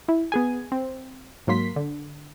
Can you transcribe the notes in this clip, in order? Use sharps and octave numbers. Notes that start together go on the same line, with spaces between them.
E4
B3 G#4 G#5
C4
G#2 F#3 A#3 C6 B6
D3